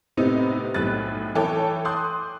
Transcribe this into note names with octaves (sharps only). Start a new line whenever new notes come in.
A2 C3 B3 C4 D#4
B1 A2 F#6 A6
E3 A4 C#5 G5 D6
C6 D6 D#6 F#6 G6